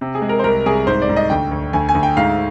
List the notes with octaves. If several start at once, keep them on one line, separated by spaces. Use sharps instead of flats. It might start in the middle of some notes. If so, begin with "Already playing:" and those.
C3
G#4
G#3
A#4
C5
C2 A#4
C2 G#4
G#2 C5
D5
G#2
D#5
D2 G5
D2
D2 G#5
G#5
D2
G5
G#2 F5